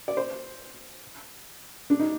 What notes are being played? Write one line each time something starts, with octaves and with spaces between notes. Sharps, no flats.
D5
C5
D4
D#4